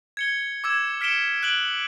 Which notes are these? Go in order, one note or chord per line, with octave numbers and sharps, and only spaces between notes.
G#6 C#7 G7
D6 E6 G#6 E7
F6 B6 C#7 D7 E7 G7
F#6 D7 F#7 G7